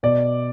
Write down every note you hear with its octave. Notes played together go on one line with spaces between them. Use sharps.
B2 D5